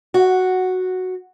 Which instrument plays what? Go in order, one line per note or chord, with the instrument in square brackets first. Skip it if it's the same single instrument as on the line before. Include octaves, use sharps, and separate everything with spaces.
[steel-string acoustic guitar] F#4